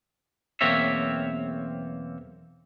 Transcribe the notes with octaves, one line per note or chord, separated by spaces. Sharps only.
B1 E2 A#3 C4 C#5 E5